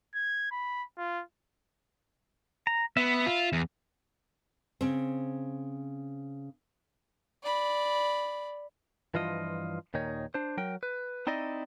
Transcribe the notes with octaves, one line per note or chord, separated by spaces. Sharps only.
G#6
B5
F4
A#5
B3 E5 B5
F4
E2
C#3 C4
D5 B5
G2 E3 F3 F4 D#5
D#2 A#2 D#3 D#4 C#5
D4 C5
F#3 A#4 G5
B4
C4 D#4 E4 D5 D#5